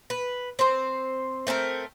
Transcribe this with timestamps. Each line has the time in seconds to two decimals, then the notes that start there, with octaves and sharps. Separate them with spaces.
0.10 B4
0.59 C4 C5
1.47 A3 C4 A4 A#4